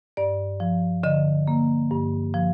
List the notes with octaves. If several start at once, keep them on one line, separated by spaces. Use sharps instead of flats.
G2 D5
F3
D3 D#5
A#3
G2
F3